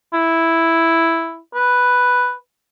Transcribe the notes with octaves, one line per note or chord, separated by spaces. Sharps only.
E4
B4